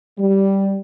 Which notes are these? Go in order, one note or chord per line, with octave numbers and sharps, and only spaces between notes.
G3